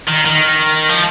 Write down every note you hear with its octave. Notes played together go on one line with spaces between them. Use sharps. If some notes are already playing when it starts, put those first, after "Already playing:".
D#3
D#3
F3